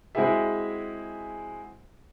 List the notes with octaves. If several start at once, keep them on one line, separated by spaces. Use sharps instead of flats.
G#3 C4 E4 F#4 G#4 E5